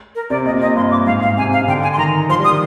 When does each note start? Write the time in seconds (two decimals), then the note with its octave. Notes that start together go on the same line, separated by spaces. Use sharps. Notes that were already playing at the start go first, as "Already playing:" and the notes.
0.15 A#4
0.30 C3 D5
0.46 A#2 D#5
0.54 C3
0.61 A#2 D#5
0.76 G2 C6
0.91 D6
1.06 G#2 F5
1.22 F5
1.37 C3 G#5
1.52 F5
1.62 C3
1.68 D3 G5
1.83 G#5
1.93 C6
1.98 D#3 A#5
2.29 F3 C6
2.39 G3
2.44 D#6
2.50 D#3